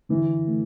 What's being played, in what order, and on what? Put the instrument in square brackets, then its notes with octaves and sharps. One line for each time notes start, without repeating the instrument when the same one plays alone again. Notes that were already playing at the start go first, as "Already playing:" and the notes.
[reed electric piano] D3 [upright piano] E3
[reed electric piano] A3